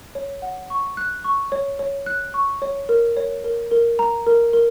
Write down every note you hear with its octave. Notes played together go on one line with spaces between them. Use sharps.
C#5
F#5
C#6
F#6
C#6
C#5
C#5
F#6
C#6
C#5
A#4
C#5
A#4
A#4
A#5
A#4
A#4